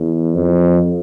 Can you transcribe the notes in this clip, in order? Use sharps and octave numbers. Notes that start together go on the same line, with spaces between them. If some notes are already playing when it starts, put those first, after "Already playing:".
Already playing: E2
F2